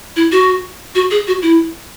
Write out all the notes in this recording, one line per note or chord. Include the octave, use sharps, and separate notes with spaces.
E4
F#4
F#4
G#4
F#4
E4